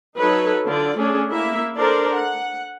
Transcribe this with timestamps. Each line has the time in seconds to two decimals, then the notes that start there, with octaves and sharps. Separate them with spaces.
0.19 F#3 D#4 A4 B4 C#5
0.65 D3 F4 D5
0.97 A3 C#4 D4 G#4
1.29 A#3 E4 E5
1.75 D4 A4 A#4 C5 D5
2.14 F#5